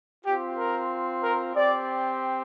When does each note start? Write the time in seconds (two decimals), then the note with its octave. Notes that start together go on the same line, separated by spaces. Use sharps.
0.25 C4 F4 G4
0.57 A#4
1.22 A#4
1.55 C4 G4 D5